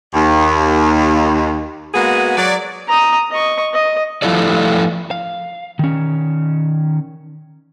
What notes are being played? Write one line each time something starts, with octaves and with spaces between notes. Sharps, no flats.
D#2
G#3 A#3 B3 F#4 G#4 B4
F#3 D5
A#5 D#6
D#5 C#6
D#5
F3 A3 E4 F4 A4 D5
F5
D#3 C#4